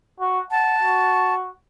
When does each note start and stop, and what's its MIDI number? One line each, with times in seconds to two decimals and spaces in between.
0.20 0.40 66
0.51 0.77 78
0.51 1.34 81
0.82 1.50 66